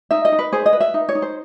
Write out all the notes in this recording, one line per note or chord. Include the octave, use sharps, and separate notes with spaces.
D#4 E5
D#5
D#4
B4
G#4 C5
D#5
B4
E5
D#4
C#5
D#4
C5